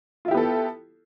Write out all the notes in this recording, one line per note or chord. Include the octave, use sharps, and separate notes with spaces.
B3 E4 F4 G4 A4